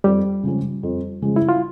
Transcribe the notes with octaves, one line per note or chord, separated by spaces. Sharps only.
F2 G3 G4
C#3 F3 G#3 C#4
F2
C#3 F3 G#3 C#4
E4
F4